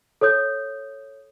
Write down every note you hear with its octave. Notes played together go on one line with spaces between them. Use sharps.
A4 C#5 D#6 G6